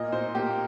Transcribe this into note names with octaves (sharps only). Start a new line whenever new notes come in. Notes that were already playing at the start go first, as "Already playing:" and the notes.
Already playing: A#2 A#3 D#5
A#2 C5
A#3 G4